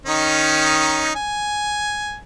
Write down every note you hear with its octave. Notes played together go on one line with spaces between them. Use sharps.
D#3 C#4 D#4
G#5